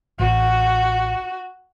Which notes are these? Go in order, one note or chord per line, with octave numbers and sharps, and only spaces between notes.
A1 F#4